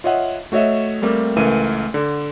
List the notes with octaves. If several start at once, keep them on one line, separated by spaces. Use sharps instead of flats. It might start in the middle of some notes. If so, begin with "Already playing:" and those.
F4 C#5 D#5 E5 F#5
A3 F#4 C#5 D#5 E5
G3 A3 A#3 C4
C#2 E3 A3 A#4 F5 D#7
D3